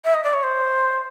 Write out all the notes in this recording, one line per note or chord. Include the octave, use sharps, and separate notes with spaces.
E5
D#5
D5
C#5
C5